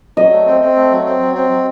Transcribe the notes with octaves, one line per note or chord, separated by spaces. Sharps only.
F#3 D#5
A3
C4
C4
A3
F#3
C4
F#3
C4
F#3